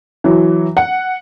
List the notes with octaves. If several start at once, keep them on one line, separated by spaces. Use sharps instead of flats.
E3 F#3
F#5